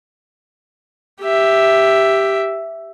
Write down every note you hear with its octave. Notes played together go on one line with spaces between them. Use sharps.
G4 E5